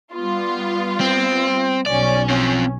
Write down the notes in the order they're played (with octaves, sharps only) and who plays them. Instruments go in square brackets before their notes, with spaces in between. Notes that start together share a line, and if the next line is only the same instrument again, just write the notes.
[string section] G3 B3 F4
[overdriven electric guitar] C4
[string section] B1 C#4 [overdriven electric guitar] D5
[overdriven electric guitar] C4 F4